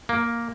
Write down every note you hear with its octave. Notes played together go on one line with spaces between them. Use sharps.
A#3